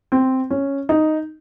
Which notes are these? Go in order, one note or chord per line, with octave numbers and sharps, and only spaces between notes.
C4
C#4
D#4